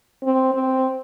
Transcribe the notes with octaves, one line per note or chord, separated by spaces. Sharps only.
C4
C4